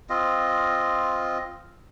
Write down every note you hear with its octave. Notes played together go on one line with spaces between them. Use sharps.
C4 F4 D#5